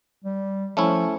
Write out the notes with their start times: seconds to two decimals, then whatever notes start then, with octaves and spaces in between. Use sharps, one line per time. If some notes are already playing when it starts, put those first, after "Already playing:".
0.24 G3
0.77 F3 A3 C#4 E4